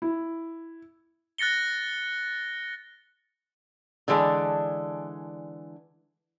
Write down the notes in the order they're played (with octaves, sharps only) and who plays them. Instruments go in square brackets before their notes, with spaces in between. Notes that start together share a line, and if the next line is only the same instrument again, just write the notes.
[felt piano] E4
[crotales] F#6 A6 A#6 C#7 G7
[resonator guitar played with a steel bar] D3 E3 G#3 D4